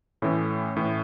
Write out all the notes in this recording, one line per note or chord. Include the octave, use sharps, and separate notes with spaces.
A2 E3 A3 C#4
A2 E3